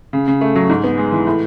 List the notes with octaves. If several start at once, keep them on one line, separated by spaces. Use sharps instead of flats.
C#3
C#3
A3
F#3
G#2
B3
G#3
E3
A2